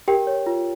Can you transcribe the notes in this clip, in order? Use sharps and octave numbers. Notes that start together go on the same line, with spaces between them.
G4 A#4 G5
C#5
F4